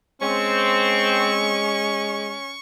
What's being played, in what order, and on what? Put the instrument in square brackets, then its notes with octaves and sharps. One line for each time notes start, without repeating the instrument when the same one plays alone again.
[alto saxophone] G#3 [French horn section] C4 [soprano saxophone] C#4 [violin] C#6